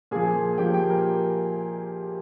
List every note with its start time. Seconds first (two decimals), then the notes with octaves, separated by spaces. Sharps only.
0.11 A#2 F3 G#4 G#5
0.58 A#2 F3 G4 G5
0.74 G4 G5
0.90 A#4 A#5